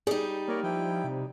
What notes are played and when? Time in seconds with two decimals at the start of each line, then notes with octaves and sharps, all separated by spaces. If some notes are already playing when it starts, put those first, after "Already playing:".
0.07 G3 D#4 G#4
0.48 A#3 A#4 C#5 D5
0.63 F3 E4 G5
1.04 C3